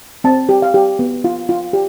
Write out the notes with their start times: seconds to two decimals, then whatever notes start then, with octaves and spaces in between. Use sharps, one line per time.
0.24 C4 A5
0.49 G4
0.62 F5
0.74 G4
0.99 B3
1.24 F4
1.49 F4
1.73 G4